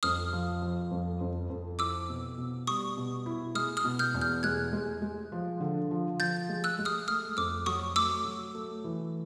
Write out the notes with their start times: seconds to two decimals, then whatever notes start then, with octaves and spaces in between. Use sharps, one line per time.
0.03 F2 D#6 F6
0.33 F3
0.62 F3
0.91 F2
1.21 F2
1.50 F2
1.79 E4 D6 E6
2.09 B2
2.38 B2
2.67 G3 C#6 D#6
2.97 B2
3.26 E4
3.55 G#3 D#6 F6
3.77 D#6 F6
3.85 B2
3.99 F6 G6
4.14 E2
4.21 F6 G6
4.43 G#3 F#6 G#6
4.73 G#3
5.02 G#3
5.32 F3
5.60 D3
5.91 F3
6.19 F3 G6 A6
6.49 G#3
6.64 E6 F#6
6.79 G#3
6.85 D#6 F6
7.08 A3 D#6 F6
7.37 F2 D6 E6
7.66 F#3 C#6 D#6
7.96 A3 D6 E6
8.25 F#3
8.55 A3
8.84 E3